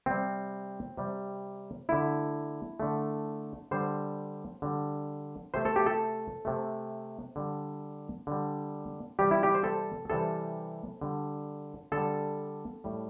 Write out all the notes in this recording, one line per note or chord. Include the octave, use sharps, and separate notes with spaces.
C3 G3 C4
C3 G3
D3 A3 E4
D3 A3
D3 G3 C5
D3 G3
C3 A3 C5
A4
G4
A4
C3 A3
D3 G3
D3 G3
C3 E3 G3 G4
E4
G4
C5
A4
C3 E3 G3 A4
D3 G3
D3 G3 A4
A2 G3